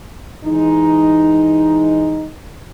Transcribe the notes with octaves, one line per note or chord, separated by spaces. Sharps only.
E3 G#3 D#4